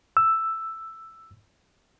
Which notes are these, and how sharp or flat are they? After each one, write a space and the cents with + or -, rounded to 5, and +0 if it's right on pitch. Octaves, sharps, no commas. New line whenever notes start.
E6 +5